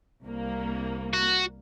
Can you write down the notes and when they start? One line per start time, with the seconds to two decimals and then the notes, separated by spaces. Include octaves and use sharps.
0.23 C2 A#3
1.13 F#4